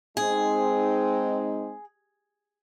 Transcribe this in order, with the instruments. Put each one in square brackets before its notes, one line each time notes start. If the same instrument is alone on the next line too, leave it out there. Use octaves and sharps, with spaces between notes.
[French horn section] G#3 C4 D#4 [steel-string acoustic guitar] G#4